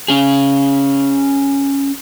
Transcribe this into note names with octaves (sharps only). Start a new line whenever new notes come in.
C#4 G#4